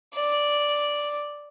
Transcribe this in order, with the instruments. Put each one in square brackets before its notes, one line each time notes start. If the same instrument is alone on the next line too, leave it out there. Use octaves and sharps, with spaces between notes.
[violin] D5